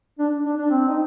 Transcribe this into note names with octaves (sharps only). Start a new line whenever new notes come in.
D4
D4
D4
C4
D#4